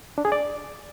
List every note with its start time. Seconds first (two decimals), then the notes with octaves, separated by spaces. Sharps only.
0.18 D4
0.25 G#4
0.32 D5